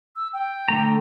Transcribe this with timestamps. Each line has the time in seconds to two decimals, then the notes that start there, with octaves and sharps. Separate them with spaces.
0.16 E6
0.33 G5
0.68 D3 A3 A#5